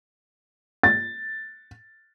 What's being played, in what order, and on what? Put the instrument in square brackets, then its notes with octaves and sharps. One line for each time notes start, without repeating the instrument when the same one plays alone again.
[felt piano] A6